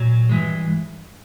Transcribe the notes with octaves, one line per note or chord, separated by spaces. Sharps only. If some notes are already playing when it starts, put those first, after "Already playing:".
Already playing: A#2 F#3
G2 E3 G#3